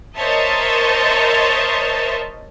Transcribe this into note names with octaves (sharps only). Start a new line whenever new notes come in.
A#4 C5 C#5 D#5 E5 A5